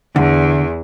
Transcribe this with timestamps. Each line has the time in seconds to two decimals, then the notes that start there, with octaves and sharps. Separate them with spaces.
0.16 E2 D3